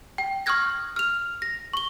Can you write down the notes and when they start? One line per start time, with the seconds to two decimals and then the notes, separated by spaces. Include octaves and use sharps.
0.18 G5
0.46 C#6 D#6 F6 F#6 G#6 A#6
0.96 F6 F7
1.42 A#6
1.73 C#6 G7